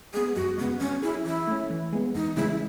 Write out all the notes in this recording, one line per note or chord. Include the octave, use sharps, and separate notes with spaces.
G#3 B3 G#4
F#2 F#4
C#3 G#3 B3
F#3 C#4
C#4 E4 G#4
E3 E4
A3 C#4
E3
G#3 B3
E2 D#4
C#3 E3 G#3 E4